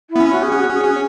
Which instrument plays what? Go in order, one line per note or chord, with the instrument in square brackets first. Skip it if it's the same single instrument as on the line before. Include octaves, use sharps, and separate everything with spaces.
[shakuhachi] E4
[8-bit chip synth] B3
C#4
[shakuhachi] F#4
G#4
[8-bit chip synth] C#4 [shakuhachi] F#4
[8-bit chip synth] C#4
[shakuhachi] G#4
[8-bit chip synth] C#4